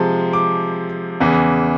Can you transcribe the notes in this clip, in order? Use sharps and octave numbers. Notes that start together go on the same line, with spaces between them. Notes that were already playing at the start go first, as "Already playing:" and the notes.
Already playing: C3 F3 G#3
D6
E2 C#3 E3